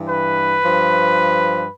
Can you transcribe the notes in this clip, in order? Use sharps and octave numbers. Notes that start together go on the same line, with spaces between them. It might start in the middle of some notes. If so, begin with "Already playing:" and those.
Already playing: G2 E3
B4
G2 F3